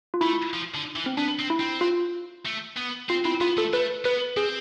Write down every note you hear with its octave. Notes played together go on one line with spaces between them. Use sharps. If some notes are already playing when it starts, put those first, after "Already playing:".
F4
A3 E4
F3
D3
E3
C4
B3 D4
C4
E4
C4
F4
A3
B3
C4 F4
C4 E4
B3 F4
A3 A4
A3 B4
B3 B4
C4 G#4